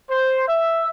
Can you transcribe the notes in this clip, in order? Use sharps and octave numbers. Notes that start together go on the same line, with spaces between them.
C5
E5